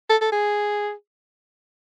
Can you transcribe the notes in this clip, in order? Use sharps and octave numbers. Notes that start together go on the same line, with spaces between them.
A4
A4
G#4